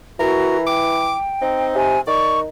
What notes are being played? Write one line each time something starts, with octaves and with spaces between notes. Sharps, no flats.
E3 F#4 A#4
G5 D6
C4 D#4
C3 G#5
D#3 D5 C#6